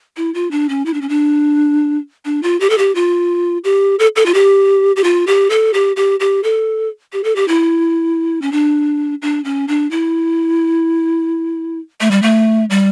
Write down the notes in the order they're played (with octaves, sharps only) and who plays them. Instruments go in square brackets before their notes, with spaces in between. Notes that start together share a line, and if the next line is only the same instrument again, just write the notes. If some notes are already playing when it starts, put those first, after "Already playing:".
[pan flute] E4
F4
D4
C#4
E4
D4
C#4
D4
D4
F4
G4
A4
G4
F4
G4
A4
A4
F4
G4
G4
F4
G4
A4
G4
G4
G4
A4
G4
A4
G4
E4
C#4
D4
D4
C#4
D4
E4
A3
G3
A3
G3